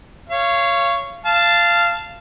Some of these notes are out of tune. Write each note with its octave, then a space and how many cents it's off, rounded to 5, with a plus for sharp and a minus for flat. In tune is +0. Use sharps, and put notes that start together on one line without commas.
C#5 +0 F5 -30
F5 -15 A5 +0